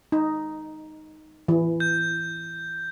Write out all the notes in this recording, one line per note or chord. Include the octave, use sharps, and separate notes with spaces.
D#4
E3
G6